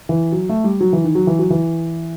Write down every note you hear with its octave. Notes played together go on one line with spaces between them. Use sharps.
E3
F#3
A3
G3
F#3
E3
D#3
F#3
E3
F#3
E3